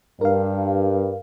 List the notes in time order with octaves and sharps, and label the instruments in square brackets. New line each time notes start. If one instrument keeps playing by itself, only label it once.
[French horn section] G2 [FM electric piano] A#4 F5